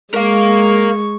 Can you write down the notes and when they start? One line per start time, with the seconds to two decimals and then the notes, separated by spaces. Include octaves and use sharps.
0.14 G#3 A#4 F5 C#6